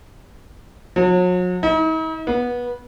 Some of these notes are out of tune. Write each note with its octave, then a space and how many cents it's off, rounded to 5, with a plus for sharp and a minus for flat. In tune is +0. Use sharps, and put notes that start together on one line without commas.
F#3 -40
D#4 +45
B3 -20